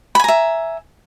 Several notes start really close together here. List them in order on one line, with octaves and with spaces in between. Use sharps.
B5 G#5 A#5 E5